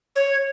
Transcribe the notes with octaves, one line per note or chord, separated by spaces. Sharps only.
C#5